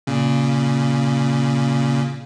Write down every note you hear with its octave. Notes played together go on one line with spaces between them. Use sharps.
A#2 C#3